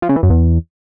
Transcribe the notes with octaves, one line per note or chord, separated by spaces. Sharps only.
F3
C#3
E3
F#2
E2